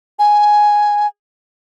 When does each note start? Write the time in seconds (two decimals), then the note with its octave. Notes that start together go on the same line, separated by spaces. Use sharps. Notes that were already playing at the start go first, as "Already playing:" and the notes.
0.19 G#5